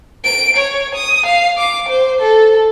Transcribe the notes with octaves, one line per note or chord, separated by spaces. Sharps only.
D7
C#5
D#6
F5
D6
C5
A4